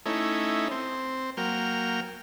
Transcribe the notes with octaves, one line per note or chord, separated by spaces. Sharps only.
A3 C#4 D#4 E4
C4
F#3 A#3 G5 F6